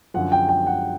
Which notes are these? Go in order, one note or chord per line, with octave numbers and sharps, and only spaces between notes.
F#2 D3 F3 F#5
G5
G5
F#5